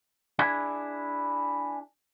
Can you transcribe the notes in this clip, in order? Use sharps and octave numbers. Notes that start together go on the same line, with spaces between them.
D4 E4 G#4